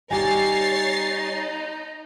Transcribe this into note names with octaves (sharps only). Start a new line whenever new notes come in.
G3 D#4 G4 C#5 G#5 A6 C7